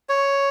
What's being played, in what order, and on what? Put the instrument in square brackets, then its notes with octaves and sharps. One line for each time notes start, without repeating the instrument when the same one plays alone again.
[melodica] C#5